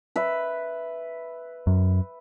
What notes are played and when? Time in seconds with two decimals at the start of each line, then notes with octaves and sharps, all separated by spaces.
0.16 B4 E5
1.67 F#2